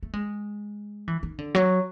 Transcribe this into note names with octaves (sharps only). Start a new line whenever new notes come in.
A3
G#3
E3
D#3
D3
F#3